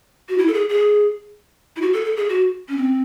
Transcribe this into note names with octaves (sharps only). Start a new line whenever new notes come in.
F#4
E4
A4
G#4
G#4
E4
F#4
A4
A4
G#4
F#4
C#4
C4